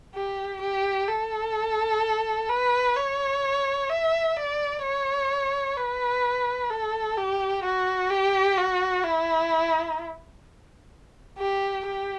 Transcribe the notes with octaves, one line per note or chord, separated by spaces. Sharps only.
G4
G4
A4
B4
C#5
E5
D5
C#5
B4
A4
G4
F#4
G4
F#4
E4
G4
G4